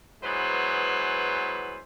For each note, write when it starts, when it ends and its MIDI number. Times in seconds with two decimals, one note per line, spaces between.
0.24 1.80 52
0.24 1.80 54
0.24 1.80 56
0.24 1.80 59
0.24 1.80 71
0.24 1.80 72